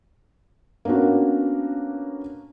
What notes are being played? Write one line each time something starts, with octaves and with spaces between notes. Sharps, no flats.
A#3 B3 C#4 D4 F#4